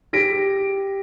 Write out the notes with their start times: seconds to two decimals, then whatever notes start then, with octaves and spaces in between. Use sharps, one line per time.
0.13 G4 A#6 B6 D7